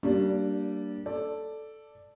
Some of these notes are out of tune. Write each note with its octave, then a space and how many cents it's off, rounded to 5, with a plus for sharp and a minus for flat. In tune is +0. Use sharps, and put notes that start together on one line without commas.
G3 -30 A#3 -15 D4 +0
A4 +0 D5 +0